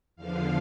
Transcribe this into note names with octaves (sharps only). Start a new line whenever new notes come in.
E2 D3 F3 F5